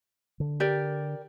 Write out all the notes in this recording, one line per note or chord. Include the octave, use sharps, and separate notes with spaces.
D3
G4 A#4 D5